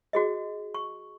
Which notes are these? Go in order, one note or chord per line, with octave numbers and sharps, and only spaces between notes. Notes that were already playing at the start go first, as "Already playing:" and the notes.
F#4 G#4 D#5
C#6